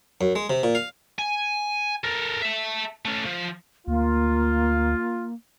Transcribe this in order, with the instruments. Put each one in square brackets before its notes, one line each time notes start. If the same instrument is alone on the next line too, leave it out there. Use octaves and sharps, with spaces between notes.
[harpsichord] F#2
G#3
C3
A#2
F5
[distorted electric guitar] G#5
A4 A#4
E5 A5
A3 C#4
F3
[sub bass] D2 [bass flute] A#3 [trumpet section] F4